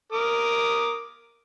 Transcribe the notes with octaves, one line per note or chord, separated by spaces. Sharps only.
A#4 D6 D#6